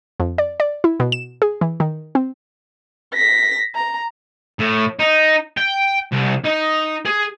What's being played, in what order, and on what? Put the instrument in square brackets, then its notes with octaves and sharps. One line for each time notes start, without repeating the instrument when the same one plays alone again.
[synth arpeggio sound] F2
D5
D5
E4
B2
E7
G#4
E3
D#3
C4
[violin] A#6 B6
A#5
[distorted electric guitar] A2
D#4
G5
C2
D#4
G#4